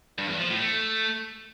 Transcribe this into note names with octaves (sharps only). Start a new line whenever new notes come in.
G2
E2
F3
A2
A3